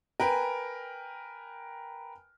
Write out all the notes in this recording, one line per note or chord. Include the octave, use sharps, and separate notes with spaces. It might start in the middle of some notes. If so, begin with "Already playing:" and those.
A#4 B4 G5 G#5